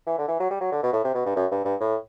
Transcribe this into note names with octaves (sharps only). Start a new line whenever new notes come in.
E3
D3
E3
F#3
G3
F#3
D3
B2
A2
C3
B2
G2
F#2
G2
G2
A2